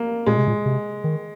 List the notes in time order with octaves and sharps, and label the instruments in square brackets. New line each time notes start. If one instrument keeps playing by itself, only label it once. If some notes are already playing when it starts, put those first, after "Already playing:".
Already playing: [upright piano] A#3
[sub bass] A#2 [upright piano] G#3
[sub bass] C3
A#2
C3
D#3